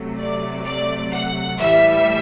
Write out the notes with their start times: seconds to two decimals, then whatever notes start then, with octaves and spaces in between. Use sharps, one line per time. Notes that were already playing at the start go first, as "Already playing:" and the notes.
Already playing: C3 F#3 A3
0.19 D5
0.66 D5
1.12 F#5
1.58 A2 E3 G3 E5